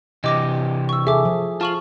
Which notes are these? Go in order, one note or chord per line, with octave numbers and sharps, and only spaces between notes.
C3 E3 G4 D#5 D6 A#6
C#6 E6
G#4 A4 E5 D6
F3
F4 A5 C#6 F#7